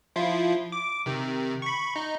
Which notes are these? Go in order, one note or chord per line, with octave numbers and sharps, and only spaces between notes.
F3 E4 F4
D6
C3 D#3
B5 C#6
D#4